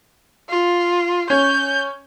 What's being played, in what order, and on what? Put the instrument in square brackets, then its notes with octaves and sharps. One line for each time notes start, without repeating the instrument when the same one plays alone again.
[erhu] F4
[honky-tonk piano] C#4 C#5 [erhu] G6